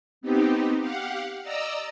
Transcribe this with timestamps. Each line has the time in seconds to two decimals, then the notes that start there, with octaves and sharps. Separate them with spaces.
0.21 B3 C4 D#4 G4
0.78 G4 F5 F#5
1.42 D5 D#5 A#5 E6